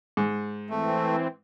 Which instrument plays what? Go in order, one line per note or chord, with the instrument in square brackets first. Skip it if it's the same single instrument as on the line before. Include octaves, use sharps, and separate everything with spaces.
[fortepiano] G#2
[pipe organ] E3 C4 [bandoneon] A3